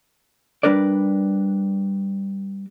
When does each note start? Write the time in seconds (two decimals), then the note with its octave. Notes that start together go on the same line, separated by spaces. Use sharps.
0.63 G3 D4 A#4 B4 D5